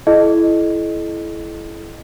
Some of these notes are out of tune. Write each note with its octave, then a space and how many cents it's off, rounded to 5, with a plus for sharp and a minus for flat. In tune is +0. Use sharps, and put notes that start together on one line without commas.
E4 +15 A4 -40 D#5 -15